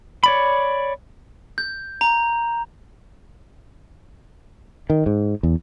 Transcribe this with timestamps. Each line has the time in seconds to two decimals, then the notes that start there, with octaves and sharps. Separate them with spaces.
0.24 C#5 D5 B5
1.58 G6
2.01 A#5
4.90 D#3
5.06 G#2
5.43 E2